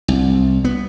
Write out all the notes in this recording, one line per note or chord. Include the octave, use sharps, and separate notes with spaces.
C2
B3